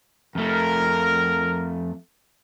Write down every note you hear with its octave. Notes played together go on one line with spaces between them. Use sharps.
F2 A3 A#4